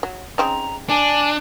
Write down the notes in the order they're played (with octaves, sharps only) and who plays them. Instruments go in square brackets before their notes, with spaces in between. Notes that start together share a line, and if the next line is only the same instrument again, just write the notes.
[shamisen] F#3
[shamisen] C#3 C4 D#4 [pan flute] A#5
[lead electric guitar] D4 [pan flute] G#5